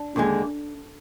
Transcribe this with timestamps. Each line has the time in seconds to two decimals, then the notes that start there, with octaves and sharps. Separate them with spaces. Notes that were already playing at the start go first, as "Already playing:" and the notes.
Already playing: D4
0.16 D#2 D3 G#3